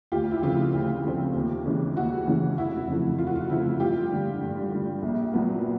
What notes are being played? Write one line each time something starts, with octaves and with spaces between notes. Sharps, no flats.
D2 F4 G4
E4
C#3 F3 A3 C4 F4
D2
C#3 F3 A3 C4
D#2
C#3 E3 G#3 C#4
D#2 E4 F#4
C#3 E3 G#3 C#4
F1 E4 F#4
F2 C#3 F3 A3
F1 F4
F#4
F4
F2 C#3 F3 A3 E4
G2 F4 G4
D3 G3
G2
D3 G3
A#1
A#2 F#3 B3